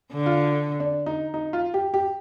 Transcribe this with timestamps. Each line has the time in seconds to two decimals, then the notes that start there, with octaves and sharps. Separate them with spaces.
0.12 D3
0.26 F4
0.80 D4
1.06 D#4
1.34 D#4
1.53 F4
1.74 G4
1.94 G4